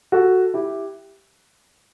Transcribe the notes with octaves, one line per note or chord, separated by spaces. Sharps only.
F#4 A4
E4 G4